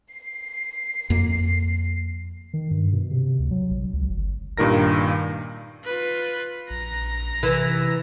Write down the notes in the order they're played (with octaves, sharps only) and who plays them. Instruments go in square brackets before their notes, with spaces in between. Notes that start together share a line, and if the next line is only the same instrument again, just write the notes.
[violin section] C7
[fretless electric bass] F2 A#3
[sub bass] D#3
G2
B2
C3
D2
F#3
A#1
C#2
G1
[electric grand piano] G2 A#2 D#3 A#4 A#6
[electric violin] F4 B4
[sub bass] A#1 [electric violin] A#5 A#6
[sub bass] C3 [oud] E3